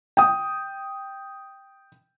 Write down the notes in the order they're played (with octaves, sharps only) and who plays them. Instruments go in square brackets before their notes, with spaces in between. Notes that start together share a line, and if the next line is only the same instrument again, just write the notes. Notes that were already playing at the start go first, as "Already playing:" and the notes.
[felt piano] G5 D#6